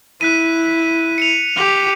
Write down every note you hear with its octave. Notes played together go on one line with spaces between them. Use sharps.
E4 F#6 B6 D#7
C#7 D#7 F7
G4